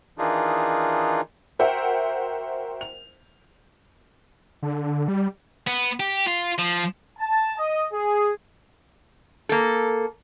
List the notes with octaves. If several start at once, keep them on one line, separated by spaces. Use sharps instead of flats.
D#3 E3 D4 D#4 F4 G#4
F#4 A#4 C5 E5 F#5 G5
F7
D3
G3
B3
G4
F4
F3
A5
D#5
G#4
A#3 A4